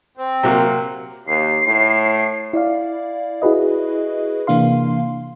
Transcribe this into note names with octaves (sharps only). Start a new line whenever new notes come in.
C4
C3 F#3 A#3
D#2 C7
A2
E4 D5 F5
E4 F#4 G#4 B4 D#5
C3 E3 A#3 D4 F5 C6